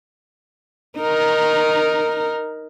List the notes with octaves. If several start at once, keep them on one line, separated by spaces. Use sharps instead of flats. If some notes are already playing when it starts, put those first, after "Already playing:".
D#4 A#4